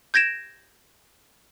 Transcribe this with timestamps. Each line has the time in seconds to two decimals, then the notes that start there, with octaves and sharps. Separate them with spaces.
0.14 G6 G#6 A#6 D7 E7